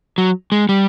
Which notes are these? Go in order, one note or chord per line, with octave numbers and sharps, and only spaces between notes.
F#3
G#3
G3